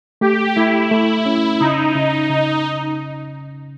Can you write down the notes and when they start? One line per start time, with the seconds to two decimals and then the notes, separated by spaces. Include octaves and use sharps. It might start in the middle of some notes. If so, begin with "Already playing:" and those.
0.21 A3 G4
0.56 A3 E4
0.91 A3
1.26 C#4
1.60 C#3 D#4
1.95 C#3
2.30 C#3 D#4